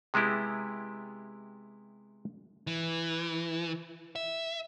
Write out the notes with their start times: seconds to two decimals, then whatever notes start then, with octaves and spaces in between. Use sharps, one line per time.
0.14 C3 G#3 B3 E4 G4
2.67 E3
4.16 E5